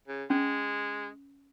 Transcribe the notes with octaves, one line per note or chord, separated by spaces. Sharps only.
C#3
G#3 C#4